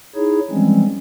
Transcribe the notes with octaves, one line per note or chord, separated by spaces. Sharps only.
D#4 E4 G#4 C#5
E3 F3 G3 G#3 C4 C#4